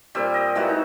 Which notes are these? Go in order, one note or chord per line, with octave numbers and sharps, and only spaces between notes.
A#2 G3 C4 G4
D#5
E3 G#3 A#3 F#4
D#4